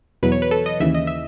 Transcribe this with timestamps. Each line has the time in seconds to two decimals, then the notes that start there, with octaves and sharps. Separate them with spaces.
0.23 E2 B2 F#3 B4
0.32 C#5
0.42 B4
0.51 A4
0.66 D#5
0.80 D#2 C#3 E3 E5
0.94 D#5
1.07 E5